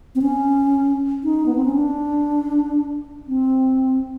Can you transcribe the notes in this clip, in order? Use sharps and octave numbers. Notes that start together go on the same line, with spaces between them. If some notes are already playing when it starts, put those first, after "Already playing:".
C4
C#4
D#4
B3
C4
C#4
D4
C4